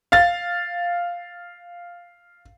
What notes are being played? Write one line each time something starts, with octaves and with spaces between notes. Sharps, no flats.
F5 A6